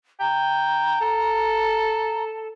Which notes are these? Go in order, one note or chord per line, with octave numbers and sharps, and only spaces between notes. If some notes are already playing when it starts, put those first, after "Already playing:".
G5 A#5
A4